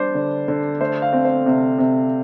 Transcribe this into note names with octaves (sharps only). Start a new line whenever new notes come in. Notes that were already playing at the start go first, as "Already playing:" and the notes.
Already playing: G3 D4 C5 D5
D3
D3
A3 C5
F5
C4
C5
C3
C3